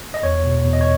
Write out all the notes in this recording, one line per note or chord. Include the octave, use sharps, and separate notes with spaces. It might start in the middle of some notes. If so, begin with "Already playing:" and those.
D#5
E2 C#5
B2
E2
D#5
C#5